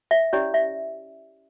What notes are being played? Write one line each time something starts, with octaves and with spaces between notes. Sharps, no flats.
E5
C#4 E4 G4 C#5 D5
E5